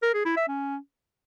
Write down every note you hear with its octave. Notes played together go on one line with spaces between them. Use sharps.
A#4
G#4
E4
E5
C#4